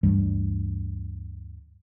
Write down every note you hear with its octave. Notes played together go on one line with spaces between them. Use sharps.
D2 G2 E3 G3